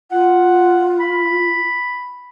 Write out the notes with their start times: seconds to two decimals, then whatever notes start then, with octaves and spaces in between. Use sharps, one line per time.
0.12 F4 F#5
0.99 B5